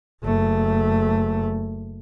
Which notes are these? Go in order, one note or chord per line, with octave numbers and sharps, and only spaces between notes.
F#1 A3